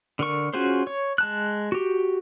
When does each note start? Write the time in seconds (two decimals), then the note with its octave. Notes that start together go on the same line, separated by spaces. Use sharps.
0.19 D3 A#4 C#6
0.53 C#4 F4 F#4 G#4 C5
0.87 C#5
1.18 G#3 A5 F#6
1.72 F#4 G4